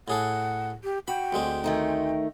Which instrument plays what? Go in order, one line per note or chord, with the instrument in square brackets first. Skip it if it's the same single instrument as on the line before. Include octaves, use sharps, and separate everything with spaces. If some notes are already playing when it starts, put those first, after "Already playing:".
[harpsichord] A2 G#4 A4 [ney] F#5
[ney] G4
[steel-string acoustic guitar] F#4 [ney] G5 [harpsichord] B5
[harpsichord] D2 G#3 C4
[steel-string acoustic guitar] D#3 A3 D#4